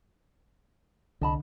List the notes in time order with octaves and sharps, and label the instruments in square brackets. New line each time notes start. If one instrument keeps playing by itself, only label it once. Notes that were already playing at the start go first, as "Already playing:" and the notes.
[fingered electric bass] C2 [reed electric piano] D3 [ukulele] D#5 A5 B5